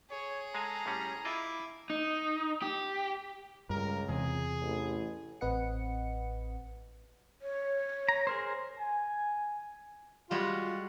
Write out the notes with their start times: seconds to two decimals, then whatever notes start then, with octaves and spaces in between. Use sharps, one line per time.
0.11 G#4 C#5
0.55 G#3 A4 F5 G#5 A#5
0.86 A2 G3 C#4
1.25 E4 F4 D#5 E5 D6
1.90 D#4
2.62 G4
3.70 C#2 G2 A#4
4.09 E2 C3 G#4
4.62 A1
5.41 A1 C4 B4 D#5 F#5 C#7
7.42 C#5
8.09 A#5
8.27 G#4 A#4 C5
8.77 G#5
10.31 G3 G#3 F4 F#4